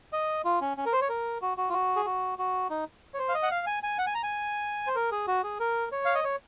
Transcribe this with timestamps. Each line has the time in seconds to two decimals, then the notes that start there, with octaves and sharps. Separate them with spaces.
0.13 D#5
0.45 F4
0.61 C#4
0.77 C#4
0.86 A#4
0.93 C5
1.01 C#5
1.09 A#4
1.42 F#4
1.58 F#4
1.69 F4
1.73 F#4
1.96 G#4
2.05 F#4
2.39 F#4
2.70 D#4
3.14 C#5
3.19 C5
3.29 F5
3.34 D#5
3.43 F#5
3.51 F5
3.67 G#5
3.83 G#5
3.98 F#5
4.07 G#5
4.15 A#5
4.23 G#5
4.87 C5
4.95 A#4
5.11 G#4
5.27 F#4
5.44 G#4
5.60 A#4
5.92 C#5
6.05 F5
6.15 D#5
6.24 C#5